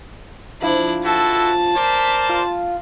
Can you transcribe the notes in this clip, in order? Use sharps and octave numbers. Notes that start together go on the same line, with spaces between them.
F3 D4 E4
E4 F#4 A4 A5
A#4 C5 D5 B6
F4